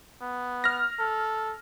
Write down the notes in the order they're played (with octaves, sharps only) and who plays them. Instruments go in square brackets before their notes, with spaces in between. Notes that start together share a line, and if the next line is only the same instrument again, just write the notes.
[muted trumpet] B3
[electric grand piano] F6 A#6
[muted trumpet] A4